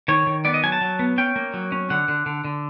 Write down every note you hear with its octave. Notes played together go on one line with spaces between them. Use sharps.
D#3 C#5
D#3
B3 D5
D#5
F#3 G#5
A5
F#3
B3
C#4 G5
A#3
F#3
C#4
D3 F#5
D3
D3
D3